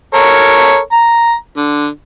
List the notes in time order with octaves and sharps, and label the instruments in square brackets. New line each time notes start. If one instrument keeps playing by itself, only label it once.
[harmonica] A4 A#4 C#5
A#5
D3